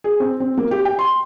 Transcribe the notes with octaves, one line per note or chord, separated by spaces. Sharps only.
G#4
C4
C4
A#3
G4
G5
C6